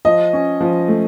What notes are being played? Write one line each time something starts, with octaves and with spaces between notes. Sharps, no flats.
F3 D#5
C#4
F3
A3